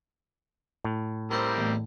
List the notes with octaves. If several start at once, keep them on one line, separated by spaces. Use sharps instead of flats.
A2
G3 C4 D#4 E4 A#4 C5
A1 E2